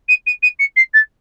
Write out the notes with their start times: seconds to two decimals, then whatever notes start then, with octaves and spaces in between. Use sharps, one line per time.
0.08 D#7
0.26 D#7
0.42 D#7
0.59 C#7
0.76 C7
0.93 A6